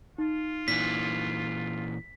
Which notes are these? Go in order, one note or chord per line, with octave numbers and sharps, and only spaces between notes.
D#4 F4
A#2 E3 B6